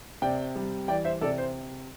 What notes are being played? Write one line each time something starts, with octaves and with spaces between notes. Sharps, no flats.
C3 D5 G5
G3
E3 D5 G5
C5 E5
C3 A4 D5
C5